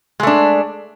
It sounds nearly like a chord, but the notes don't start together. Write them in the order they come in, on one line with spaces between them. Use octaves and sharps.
G#3 A3 D4